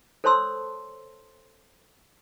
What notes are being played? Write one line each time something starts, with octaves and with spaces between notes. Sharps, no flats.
A4 C5 C#5 A5 C6 E6